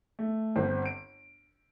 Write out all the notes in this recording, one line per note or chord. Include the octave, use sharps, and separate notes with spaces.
A3
G1 C4
D7